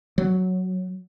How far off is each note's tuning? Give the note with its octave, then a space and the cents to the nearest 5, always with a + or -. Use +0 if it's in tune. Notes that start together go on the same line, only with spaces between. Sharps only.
F#3 +0